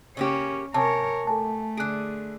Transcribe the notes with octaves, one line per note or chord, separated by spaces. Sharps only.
C#3 A#3 C#4 G4
C3 A#4 C#5 G#5 A5
A3 A4 G#5 A5
D3 G#4 F#6 D7